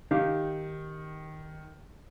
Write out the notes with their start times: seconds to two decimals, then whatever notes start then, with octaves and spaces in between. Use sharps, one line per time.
0.11 D#3 D#4 G4 F5